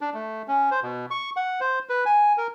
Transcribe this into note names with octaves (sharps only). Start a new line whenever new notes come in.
D4
A3
C#4
C5
B2
C#6
F#5
C5
B4
G#5
A#4